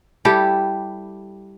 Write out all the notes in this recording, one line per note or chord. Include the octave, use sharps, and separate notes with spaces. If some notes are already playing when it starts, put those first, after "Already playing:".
G3 E4 G4 A4